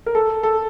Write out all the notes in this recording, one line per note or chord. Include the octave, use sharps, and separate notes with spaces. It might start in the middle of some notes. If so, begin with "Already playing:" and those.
A#4
A4
A4